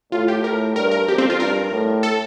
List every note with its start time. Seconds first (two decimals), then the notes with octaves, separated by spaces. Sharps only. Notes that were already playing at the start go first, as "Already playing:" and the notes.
0.12 A2 F4
0.28 G4
0.44 A2 A#4
0.76 G2 A#4
0.91 A#4
1.08 F2 G4
1.18 C4
1.30 F4
1.40 G2 A#4
1.72 A2
2.03 A4